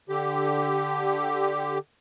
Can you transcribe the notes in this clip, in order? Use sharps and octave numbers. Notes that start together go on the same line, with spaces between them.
D3 G4